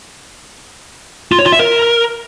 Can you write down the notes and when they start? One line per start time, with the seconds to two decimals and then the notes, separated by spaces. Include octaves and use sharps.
1.32 F4
1.39 C#5
1.46 F4
1.52 E5
1.59 A#4